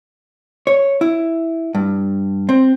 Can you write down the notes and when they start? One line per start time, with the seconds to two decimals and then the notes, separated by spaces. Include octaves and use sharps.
0.67 C#5
1.01 E4
1.75 G2
2.49 C4